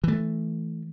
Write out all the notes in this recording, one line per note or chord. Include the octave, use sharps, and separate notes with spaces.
E3 A3